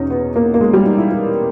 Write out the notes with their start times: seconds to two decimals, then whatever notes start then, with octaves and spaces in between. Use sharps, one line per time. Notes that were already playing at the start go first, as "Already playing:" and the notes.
Already playing: E2 B2 C#4 D#4
0.10 B3
0.36 A#3
0.54 A#3
0.61 G#3
0.73 G3
0.86 D#4
0.98 E4
1.11 E4